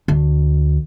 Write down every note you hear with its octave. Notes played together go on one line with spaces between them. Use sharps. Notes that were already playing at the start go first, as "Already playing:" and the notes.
D2